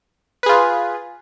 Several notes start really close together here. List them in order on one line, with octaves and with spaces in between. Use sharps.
B4 G#4 F4